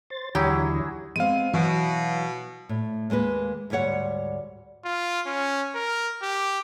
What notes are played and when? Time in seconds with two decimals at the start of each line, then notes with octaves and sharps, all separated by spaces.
0.10 C5 A6
0.35 D#2 D3 E3 F#3 E4 G4 G#4
1.16 G#3 B3 C4 F5 D#7
1.53 B2 E3 F#3
2.69 A2
3.10 D#2 G#3 A#3 B4
3.70 D2 G#2 G3 C#5 F#5
4.85 F4
5.26 C#4
5.75 A#4
6.22 G4